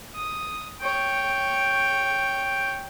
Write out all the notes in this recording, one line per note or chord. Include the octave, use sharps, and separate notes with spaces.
D#6
C#5 G5